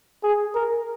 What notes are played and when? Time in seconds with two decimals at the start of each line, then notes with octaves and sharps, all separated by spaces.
0.23 G#4
0.55 A#4